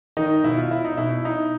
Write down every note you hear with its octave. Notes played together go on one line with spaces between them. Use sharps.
D#3 D#4
B2 E4
F4
E4
D#4
B2 E4
D#4